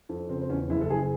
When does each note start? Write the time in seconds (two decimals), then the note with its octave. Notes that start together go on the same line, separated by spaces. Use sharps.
0.09 F2
0.29 C#3 C4
0.42 C4
0.49 E2 C#4
0.70 F#1 E4
0.81 A4
0.90 F#1 G#4